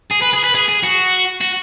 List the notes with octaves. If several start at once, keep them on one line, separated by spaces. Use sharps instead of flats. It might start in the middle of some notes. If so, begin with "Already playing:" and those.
G#4
B4
G#4
B4
G#4
G#4
F#4
F#4